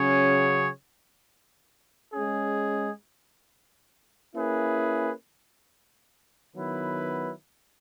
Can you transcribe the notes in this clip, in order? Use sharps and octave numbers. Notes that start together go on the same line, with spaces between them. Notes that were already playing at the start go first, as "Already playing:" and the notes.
Already playing: C#3 F#3 C#4 G#4 C#5
G#3 C#4 G#4
A#3 C#4 E4 G#4 B4
D#3 F#3 B3 E4 B4